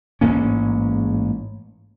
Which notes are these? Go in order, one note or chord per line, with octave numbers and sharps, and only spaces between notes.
A1 G#2 A#3 C#4